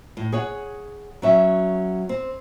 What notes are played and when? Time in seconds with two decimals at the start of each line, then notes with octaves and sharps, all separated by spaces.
0.17 A2
0.32 G#4 C#5 F#5
1.22 F#3 C#4 E5
2.09 C4